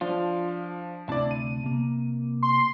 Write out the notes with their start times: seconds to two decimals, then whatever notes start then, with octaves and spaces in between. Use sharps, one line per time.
0.01 F3 D4 F4
1.09 D2 C3 D4 E4 D5 A5
1.31 D#7
1.63 C3 A#3
2.43 C6